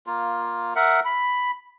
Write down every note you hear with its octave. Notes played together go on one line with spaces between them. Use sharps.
A#3 F4
A#4 E5 F#5
B5